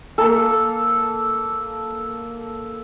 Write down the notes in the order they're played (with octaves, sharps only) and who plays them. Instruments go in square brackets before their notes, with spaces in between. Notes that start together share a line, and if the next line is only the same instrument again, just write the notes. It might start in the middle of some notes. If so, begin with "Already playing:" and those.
[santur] A#3 A4